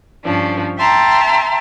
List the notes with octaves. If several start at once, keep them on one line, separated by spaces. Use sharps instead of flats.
G2 F3 C#4 D4
E5 G5 A5 A#5 C6